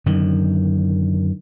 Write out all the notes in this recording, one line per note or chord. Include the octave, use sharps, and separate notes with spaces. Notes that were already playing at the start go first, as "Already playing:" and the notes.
F#2 D3 D#3